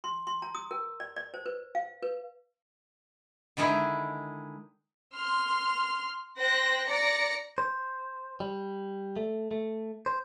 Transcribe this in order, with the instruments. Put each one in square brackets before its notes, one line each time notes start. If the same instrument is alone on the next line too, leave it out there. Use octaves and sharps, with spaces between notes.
[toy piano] C6
C6
A#5
D#6
A#4
D5
D5
C5
B4
F5
B4
[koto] D3 D#3 G#3 D#4 E4
[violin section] C6 F6
C5 G5 F#6 A#6
D5 A#5 A#6 C#7
[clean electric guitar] C5
G3
A3
A3
C5